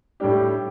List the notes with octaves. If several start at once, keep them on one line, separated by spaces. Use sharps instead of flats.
A2 G3 D4 G4